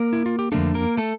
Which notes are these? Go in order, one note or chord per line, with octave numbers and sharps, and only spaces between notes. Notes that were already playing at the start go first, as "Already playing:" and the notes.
Already playing: A#3 A#4
E4
F4
G4
F2 D3 G3 A3 A#3 D4 A4
A#3 A#4
A3 A4